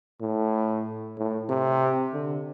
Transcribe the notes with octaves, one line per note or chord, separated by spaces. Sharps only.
A2
A2
C3
D3